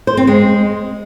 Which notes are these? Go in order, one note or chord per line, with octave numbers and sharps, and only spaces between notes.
C5
C4
G#3